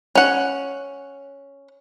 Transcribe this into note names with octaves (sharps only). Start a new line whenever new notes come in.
C#4 F#5